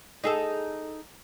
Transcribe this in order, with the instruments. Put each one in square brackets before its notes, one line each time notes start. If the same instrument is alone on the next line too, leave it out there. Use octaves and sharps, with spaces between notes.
[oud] D#4 G#4 A4